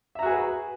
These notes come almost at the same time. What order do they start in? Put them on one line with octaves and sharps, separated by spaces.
E5 A#5 F#4 G#4 B4